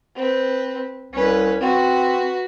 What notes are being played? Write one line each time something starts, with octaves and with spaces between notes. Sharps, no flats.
C4 B4
C2 C#4 B4
C4 F#4 B4